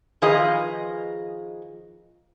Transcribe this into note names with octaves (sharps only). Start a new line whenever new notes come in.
D#3 F3 F4 G#4 B4 D#5